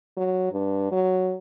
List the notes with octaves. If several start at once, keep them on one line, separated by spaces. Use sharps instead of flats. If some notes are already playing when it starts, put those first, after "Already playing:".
F#3
G2
F#3